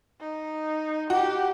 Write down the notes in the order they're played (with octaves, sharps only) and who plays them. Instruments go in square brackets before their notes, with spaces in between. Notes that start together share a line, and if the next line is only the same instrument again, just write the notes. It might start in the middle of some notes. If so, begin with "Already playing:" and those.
[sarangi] D#4
[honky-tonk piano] F#4 [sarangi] G4